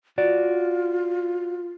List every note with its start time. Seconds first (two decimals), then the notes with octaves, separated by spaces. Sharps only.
0.18 F4 F#4 D5